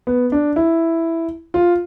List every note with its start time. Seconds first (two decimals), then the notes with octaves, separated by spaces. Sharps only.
0.07 B3
0.32 D4
0.56 E4
1.54 F4